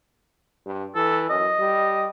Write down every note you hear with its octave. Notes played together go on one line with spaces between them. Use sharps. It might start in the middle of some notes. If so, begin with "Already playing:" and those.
G2
E3 A4
F#2 D#5
G3